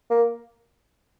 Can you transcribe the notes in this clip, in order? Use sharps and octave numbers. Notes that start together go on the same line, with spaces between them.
A#3